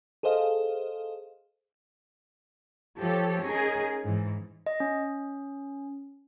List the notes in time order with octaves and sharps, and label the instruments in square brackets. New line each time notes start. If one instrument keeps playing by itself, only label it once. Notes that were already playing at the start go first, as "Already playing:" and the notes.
[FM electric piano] G#4 A4 C5 D#5 F5
[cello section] F3 G4 A4 C#5
C#4 D#4 G#4 A#4
G#2 E3
[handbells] D#5
C#4